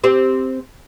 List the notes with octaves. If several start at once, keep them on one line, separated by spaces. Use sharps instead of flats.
C4 G4 C5